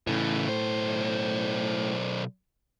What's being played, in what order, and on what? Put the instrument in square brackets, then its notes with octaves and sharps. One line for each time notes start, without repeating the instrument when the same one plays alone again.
[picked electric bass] A2 [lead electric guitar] C#3 E3
[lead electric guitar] B1 C5